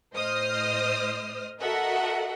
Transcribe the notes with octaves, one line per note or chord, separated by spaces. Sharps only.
A2 C5 D#5 D#6 F6
F#4 A4 A#4 D#5 E5 F#5